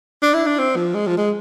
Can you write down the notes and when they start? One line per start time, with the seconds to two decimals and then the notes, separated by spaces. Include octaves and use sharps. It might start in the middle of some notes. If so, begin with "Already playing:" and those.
0.22 D4
0.34 E4
0.47 D4
0.59 C4
0.76 F3
0.94 G#3
1.07 F3
1.18 G#3